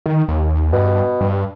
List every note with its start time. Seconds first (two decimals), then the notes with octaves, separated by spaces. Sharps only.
0.06 D#3
0.28 D#2
0.73 G2 B2
1.21 G2